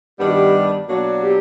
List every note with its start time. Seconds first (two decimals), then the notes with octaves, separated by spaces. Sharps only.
0.19 G2 D#3 G3 B3 D4 G4
0.27 F#4
0.34 G4
0.88 B2 F#3 A#3 D4 F#4
1.23 G4